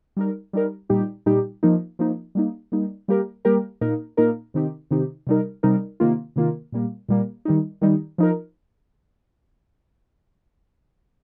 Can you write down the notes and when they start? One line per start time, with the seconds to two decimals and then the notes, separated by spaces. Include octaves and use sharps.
0.17 G3 D#4 A#4
0.53 G3 D#4 A#4
0.90 A#2 G3 D#4 G4
1.26 A#2 G3 D#4 G4
1.63 F3 A#3 D#4
1.99 F3 A#3 D#4
2.35 G3 A#3 D#4
2.72 G3 A#3 D#4
3.08 G3 A#3 G4 A#4
3.45 G3 A#3 G4 A#4
3.81 A#2 A#3 D#4 A#4
4.17 A#2 A#3 D#4 A#4
4.54 C3 D#3 C4 D#4 G4
4.91 C3 D#3 C4 D#4 G4
5.27 C3 G3 D#4 A#4
5.63 C3 G3 D#4 A#4
6.00 C3 D#3 A#3 F4
6.36 C3 D#3 A#3 F4
6.72 A#2 G3 A#3
7.09 A#2 G3 A#3
7.45 D#3 G3 D#4
7.81 D#3 G3 D#4
8.18 F3 D#4 A#4